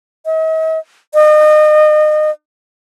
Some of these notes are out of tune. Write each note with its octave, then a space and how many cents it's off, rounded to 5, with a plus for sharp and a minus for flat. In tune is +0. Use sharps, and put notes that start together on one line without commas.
D#5 +45
D#5 -30